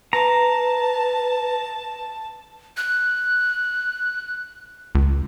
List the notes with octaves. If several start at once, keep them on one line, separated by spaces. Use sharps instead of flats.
B4 A5 A#5
F#6
C#2